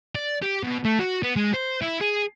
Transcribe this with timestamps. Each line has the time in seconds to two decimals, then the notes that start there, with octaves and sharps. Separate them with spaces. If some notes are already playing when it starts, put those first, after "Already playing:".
0.15 D5
0.42 G4
0.63 B2
0.85 A3
0.99 F#4
1.23 B3
1.36 G#3
1.54 C5
1.82 E4
2.01 G#4